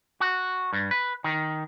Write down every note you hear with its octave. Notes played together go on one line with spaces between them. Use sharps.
F#4
G2
B4
D#3